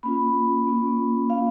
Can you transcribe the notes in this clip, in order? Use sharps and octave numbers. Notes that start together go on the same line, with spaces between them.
A#3 C#4 F4 B5
A#3 C#4 F4
A#3 C#4 F4 F5